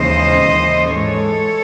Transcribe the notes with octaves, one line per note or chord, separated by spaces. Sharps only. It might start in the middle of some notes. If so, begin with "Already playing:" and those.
Already playing: D#2 C#3 E3 G#3 C5 D#5
D#2 C#3 E3
G#2 E3 G#3 A4 C#5